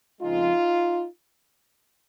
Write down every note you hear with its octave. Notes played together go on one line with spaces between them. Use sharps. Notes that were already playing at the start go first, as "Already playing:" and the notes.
F2 C#3 F3 G#3 D#4 F4